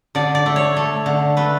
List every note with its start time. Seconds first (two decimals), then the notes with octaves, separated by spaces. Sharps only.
0.15 D3 D5
0.35 D5
0.46 A3
0.56 C#5
0.77 A3
1.06 D3
1.37 A3 B4